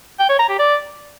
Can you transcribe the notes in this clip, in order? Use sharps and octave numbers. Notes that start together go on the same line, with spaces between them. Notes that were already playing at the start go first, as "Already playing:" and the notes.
G5
C#5
A#5
G4
D5